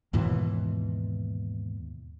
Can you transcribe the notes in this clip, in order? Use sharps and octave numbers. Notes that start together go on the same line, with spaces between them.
D#2 G#2 B2 E3